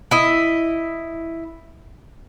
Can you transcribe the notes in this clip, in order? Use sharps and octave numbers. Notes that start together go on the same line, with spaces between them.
E4 D#5